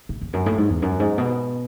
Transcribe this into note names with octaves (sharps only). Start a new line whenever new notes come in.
A2
E2
F#2
A2
G#2
E2
F#2
G#2
B2